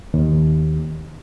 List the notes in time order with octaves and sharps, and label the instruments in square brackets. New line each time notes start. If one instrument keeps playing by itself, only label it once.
[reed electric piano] D#2